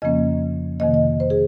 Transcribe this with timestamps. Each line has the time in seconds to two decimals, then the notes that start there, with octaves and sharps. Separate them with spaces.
0.02 F2 C#3 F3 A#3 C#4 D#5
0.80 F2 C3 D#3 A#3 D#5
0.94 D#5
1.20 C5
1.30 G#4